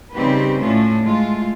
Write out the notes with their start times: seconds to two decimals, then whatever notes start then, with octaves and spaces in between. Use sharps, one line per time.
0.14 C#3 G3 C4 D#4 G4 B4
0.60 A2 A3 C#4 D4 F4
1.03 G#3 A3 F4